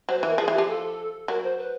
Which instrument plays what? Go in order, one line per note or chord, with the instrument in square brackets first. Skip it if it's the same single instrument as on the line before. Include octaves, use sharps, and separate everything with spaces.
[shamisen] F#3 [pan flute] C5
[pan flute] B4
[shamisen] E3
[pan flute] A#4
[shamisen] F3 [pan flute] G#4
[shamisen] E3
[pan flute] G4
[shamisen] F3
[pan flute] A4
[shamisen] F#3 [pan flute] A#4
[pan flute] C5
B4